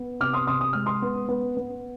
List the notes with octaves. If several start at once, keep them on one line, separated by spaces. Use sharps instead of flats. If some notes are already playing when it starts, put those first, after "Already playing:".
Already playing: B3
C3 D6 F6
C6 D#6
C3 C6 D#6
D#6
G#3 F6
C6 D#6
B3
B3
B3